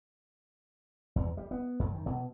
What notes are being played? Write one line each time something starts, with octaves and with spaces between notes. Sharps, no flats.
E2
G3
B3
F#2
D#3
B2